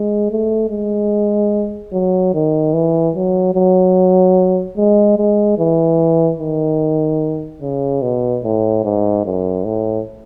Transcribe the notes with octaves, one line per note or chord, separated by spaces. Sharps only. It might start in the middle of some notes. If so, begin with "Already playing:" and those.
Already playing: G#3
A3
G#3
F#3
D#3
E3
F#3
F#3
G#3
G#3
E3
D#3
C#3
B2
A2
G#2
F#2
A2